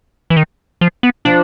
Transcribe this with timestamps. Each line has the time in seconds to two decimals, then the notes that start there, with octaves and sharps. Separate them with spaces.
0.30 E3
0.37 D#3
0.81 F3
1.03 B3
1.25 F3 D4